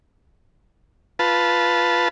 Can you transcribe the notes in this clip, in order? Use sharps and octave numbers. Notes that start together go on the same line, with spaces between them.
F4 B4 A5